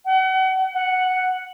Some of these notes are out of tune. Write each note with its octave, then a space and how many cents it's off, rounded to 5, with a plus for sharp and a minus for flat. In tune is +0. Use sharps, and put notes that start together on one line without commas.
F#5 +35
F#5 +0